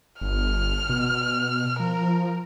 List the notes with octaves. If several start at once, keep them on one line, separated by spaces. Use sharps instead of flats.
G1 F6
B2
F3 A#4